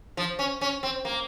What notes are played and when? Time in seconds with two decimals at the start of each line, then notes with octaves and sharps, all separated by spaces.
0.17 F3
0.39 C#4
0.61 C#4
0.83 C4
1.05 A#3